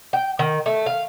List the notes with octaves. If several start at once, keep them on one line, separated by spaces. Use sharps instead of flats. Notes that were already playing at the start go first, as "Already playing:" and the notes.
G5
D#3
A3
F5